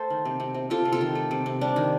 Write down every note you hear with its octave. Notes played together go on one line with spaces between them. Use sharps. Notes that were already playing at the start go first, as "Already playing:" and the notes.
Already playing: A3 A4 C5
D#3
C3
C3
C3
C3 F4 A4
C3
F4 A4
D#3
A3
C3
C3
G3 D4
D#3